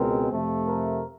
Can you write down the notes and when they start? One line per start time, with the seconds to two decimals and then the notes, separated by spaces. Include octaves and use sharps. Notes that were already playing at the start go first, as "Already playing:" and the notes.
Already playing: C#2 B2 G#3 C4 A#4
0.29 F2 C3 F3 A3
0.66 A#4